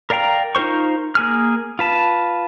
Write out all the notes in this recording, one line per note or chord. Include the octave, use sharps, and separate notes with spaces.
A#4 D5 F5 G5 A#5
D#4 F4 A#4 C5 C#6
A#3 G#4 F6
F4 B4 A5